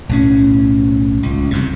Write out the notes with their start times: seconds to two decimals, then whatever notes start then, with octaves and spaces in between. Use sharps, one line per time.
0.09 B1 A2 C#4
1.23 C#2
1.51 C2 F#2 C3